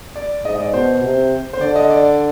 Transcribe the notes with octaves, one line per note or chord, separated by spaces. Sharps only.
D5
G#2 D#5
D#5
D5
B2 C5
C3
C5
D3 D5
D#5
D5